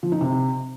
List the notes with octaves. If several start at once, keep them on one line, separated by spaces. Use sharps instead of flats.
F3
D#4
C3